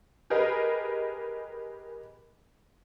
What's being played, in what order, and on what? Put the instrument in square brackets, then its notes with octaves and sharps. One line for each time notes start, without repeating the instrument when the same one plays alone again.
[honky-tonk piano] G4 G#4 A#4 B4 D#5